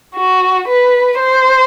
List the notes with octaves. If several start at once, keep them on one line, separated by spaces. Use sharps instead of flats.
F#4
B4
C5